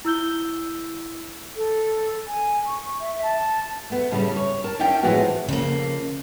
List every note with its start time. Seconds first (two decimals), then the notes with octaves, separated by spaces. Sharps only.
0.05 E4 E6 G6 G7
1.56 A4
2.28 G#5
2.66 C#6
3.01 E5
3.22 A5
3.90 A3 B3
4.11 A2 C#3 G3
4.36 C#5
4.64 A#4 A5
4.79 C#4 D4 E4 E5 G5
5.03 A2 E3 F3 G#3 B3 F#4
5.48 F2 C#3 A#3